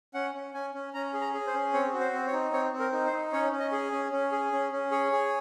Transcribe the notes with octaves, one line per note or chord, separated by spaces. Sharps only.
C#4 F#5
C#4
C#4 G#5
C#4
C#4 A#5
G#4
A#5
G#4
C5
C#4
C4 C#5
F#4
C5
C4
C#5
D#4
C4 C#5
C4
A#4
D#4
C5
D#4
C#4 C#5
C#4
D#5
G#4
C#4
C#4
G#4
C#4
C#4
G#4 C#5
G#4